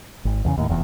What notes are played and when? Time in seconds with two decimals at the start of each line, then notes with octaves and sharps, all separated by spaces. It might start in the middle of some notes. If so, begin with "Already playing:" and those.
0.25 G#1
0.45 E2 A#2 C#3
0.57 D#2 A2
0.69 F1 E2